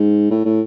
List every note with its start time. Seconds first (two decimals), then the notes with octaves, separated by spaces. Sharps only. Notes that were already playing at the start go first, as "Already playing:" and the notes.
Already playing: G#2
0.30 A2
0.45 A2